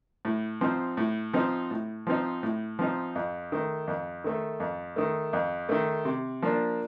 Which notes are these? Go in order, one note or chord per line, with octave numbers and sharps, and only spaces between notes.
A2
F3 C4 D#4
A2
F3 C4 D#4
A2
F3 C4 D#4
A2
F3 C4 D#4
F2
D#3 A3
F2
D#3 A3
F2
D#3 A3
F2
D#3 A3
C3
F3 A#3 D4